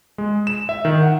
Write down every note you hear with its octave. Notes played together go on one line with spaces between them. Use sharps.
G#3
E7
E5
D#3
F#5